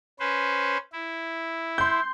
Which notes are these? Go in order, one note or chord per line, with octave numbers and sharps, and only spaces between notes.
C#4 B4 C5
E4
C6 G6